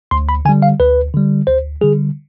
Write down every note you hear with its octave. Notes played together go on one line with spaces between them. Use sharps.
D2 C6
B5
D3 G3 G#5
F5
D2 B4
D3 G3
D2 C5
D3 G3 G#4